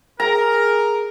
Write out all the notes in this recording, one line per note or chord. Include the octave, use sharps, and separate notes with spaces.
G#4 A#4 A#5